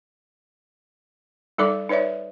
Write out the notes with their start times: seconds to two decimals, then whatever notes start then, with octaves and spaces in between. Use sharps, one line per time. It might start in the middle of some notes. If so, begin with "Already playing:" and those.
1.58 G3 D#4 A4 D5 D6
1.89 D#4 B4 C#5 D5 E5